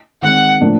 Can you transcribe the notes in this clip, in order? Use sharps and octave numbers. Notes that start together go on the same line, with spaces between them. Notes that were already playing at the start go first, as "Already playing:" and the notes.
D#3 G#3 C4 F#5
A2 F3 A#3 D4